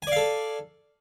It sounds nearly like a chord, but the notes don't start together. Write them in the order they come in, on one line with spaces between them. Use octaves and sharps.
G#5 D5 F5 A4